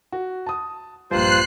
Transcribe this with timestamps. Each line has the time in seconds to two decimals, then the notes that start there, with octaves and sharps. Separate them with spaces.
0.12 F#4
0.47 A5 D#6
1.11 A#1 G2 F4 C5 F#6 C7